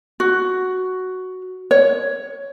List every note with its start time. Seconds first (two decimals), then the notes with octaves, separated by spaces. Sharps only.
0.20 F#4
1.71 C#5